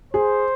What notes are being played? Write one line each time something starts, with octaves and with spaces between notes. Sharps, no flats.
G#4 C5